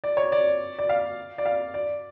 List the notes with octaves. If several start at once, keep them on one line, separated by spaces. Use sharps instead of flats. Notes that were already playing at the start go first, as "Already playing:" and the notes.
D5
C#5
D5
D5
F5
D5
F5
D5